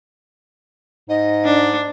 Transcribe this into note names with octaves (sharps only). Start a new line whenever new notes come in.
G#2 D#5
D4